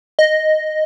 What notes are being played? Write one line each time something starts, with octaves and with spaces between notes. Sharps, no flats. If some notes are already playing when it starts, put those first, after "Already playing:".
D#5